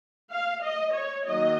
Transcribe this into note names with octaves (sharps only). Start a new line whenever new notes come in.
F5
D#5
C#5
D#3 F#3 A#3 D#5